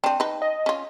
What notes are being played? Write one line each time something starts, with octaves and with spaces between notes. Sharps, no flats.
C4 D4 G5 A5
D#4 B4
D#5
C#4 F4